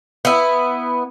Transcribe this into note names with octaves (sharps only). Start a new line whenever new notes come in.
B3 E4